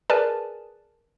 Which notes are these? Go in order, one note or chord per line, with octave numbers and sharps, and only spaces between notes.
G#4 A#4 B4 D5 G#5 A5